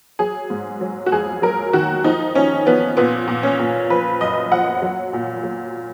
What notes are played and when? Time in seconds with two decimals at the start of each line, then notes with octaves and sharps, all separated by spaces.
0.19 F#3 G#4
0.50 G#2
0.81 F#3
1.06 F#4
1.12 F2 G#4
1.42 F#3 A#4
1.73 D#3 F#4
2.04 F3 D#4
2.35 F3 C#4
2.66 F3 B3
2.97 A#2 B3
3.27 A#2
3.43 C#4
3.59 A#2
3.90 F3 B4
4.21 F#2 D#5
4.52 F3 F#5
4.82 F#3
5.13 A#2
5.44 F#3